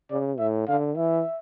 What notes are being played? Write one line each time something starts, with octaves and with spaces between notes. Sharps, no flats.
C#3 D5
A2 E5
D3 F5
E3 E5